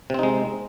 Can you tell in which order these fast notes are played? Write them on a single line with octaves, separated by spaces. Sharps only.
C3 C4 D#4 G#3